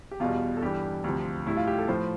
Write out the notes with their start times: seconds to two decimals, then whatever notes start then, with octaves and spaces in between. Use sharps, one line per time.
0.11 G4
0.20 E2 B2 G3 F4
0.57 A4
0.62 G2 E3 G3 G4
1.04 D2 C3 F3
1.46 A2 G3 E4
1.57 F4
1.67 G4
1.79 A4
1.88 A2 F3 C5